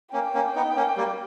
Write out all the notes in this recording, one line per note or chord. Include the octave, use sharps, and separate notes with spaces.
A#3 C#4 G5
A#3 C#4
B3 D#4
A#3 C#4
G3 A#3